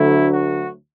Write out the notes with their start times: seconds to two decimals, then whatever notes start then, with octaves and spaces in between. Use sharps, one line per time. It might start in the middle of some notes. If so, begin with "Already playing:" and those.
Already playing: D2 D3 F#3 A3 E4
0.32 F#4